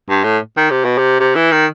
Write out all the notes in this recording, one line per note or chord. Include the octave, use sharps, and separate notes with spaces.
G2
A2
D#3
C3
B2
C3
C3
E3
D#3